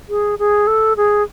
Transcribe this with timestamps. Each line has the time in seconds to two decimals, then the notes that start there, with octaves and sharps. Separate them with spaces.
0.09 G#4
0.39 G#4
0.67 A4
0.97 G#4